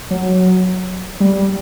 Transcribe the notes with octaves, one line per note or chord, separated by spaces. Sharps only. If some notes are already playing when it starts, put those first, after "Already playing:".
F#3
G3